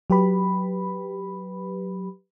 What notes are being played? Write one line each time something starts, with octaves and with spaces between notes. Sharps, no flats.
F#3 G4 B4 B5